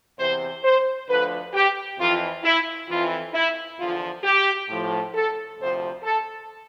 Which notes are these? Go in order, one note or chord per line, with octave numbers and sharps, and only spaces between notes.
E2 C3 E3 C5
C5
D2 D3 F3 B4
G4
F2 E3 F4
E4
F2 E3 F4
E4
E2 D3 F3 F4
G4
A2 F3
A4
D2 C3 F3 C5
A4